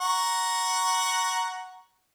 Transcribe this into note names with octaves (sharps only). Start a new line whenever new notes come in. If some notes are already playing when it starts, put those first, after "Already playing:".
F#5 A#5 C#6